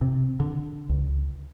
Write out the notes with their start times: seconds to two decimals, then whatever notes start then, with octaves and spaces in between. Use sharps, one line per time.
0.01 C3
0.40 D3
0.89 C#2